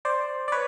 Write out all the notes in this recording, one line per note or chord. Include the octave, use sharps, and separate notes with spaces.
C5 D5
D5
B4 C#5